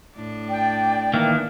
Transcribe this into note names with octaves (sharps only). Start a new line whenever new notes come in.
A2 D4
D5 G5
D#3 E3 A#3